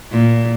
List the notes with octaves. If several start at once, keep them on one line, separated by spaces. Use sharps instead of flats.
A#2